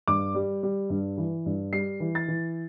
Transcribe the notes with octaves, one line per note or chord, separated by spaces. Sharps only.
G2 D6
G3
G3
G2
E3
G2
G3 C7
E3
A6
E3